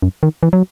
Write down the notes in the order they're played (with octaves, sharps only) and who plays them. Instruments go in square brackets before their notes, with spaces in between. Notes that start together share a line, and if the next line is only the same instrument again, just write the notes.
[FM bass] F#2
D#3
E3
F#3